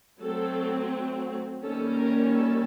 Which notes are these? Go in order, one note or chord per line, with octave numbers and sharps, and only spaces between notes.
F#3 A3 C4 A4
D#3 G3 A#3 C#4 A4
A#4
A4